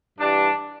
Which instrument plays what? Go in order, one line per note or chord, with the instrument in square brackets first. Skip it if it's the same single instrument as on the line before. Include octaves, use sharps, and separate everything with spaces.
[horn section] G2 E3 G3 D4